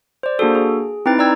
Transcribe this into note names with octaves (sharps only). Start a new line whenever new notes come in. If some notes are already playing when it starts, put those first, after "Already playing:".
C5 D5
A#3 D4 F#4 G#4 A4
G#4
C4 D#4 E4 B4 G5 A6
C4 D#4 D5 A#5 E6 G#6